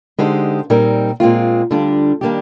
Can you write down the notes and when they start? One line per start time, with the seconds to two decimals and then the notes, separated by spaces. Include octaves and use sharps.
0.18 D3 G#3 D#4 G4 C5
0.70 A#2 G3 C4 D#4 A#4
1.20 A#2 G#3 C4 F4
1.71 D2 D3 G3 D4 F4
2.21 D#3 G3 A#3 D4 G4